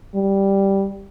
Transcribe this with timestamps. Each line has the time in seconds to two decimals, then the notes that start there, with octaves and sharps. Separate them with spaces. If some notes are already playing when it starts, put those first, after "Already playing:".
0.15 G3